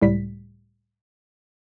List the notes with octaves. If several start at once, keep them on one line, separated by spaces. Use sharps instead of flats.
C#2 A2 G3 B6